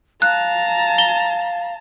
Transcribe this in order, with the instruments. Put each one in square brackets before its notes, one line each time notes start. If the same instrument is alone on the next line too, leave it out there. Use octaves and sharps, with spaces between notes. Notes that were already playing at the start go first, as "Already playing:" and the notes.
[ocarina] F5 [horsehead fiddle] A5 A#5 [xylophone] F#6
[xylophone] G7